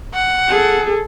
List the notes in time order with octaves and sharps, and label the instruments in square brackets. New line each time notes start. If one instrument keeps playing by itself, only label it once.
[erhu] F#5
[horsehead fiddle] G#4 A4